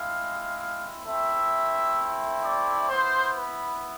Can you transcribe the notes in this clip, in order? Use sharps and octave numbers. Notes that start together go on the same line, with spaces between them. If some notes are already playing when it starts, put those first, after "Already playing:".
Already playing: G#3 C4 E4 F5
A3 C4 E4 E5
D5
B3 E4 C5
B4